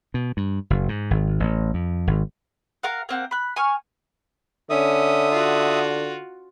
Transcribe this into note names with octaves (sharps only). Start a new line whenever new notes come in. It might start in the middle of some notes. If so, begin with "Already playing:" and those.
B2
G2
F#1
G#2
G#1
A1
F2
G#1
A#4 F5 F#5
A#3 C4 F#5
B5 F#6
G#5 C#6 F6
D3 C#4 E5 D#6
F4 F#4